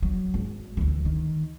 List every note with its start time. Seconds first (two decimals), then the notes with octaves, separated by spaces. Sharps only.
0.02 F#3
0.34 G#1
0.77 D2 E3
1.05 D#3